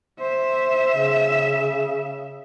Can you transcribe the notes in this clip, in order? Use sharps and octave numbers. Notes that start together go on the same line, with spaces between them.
C5 E5
C#3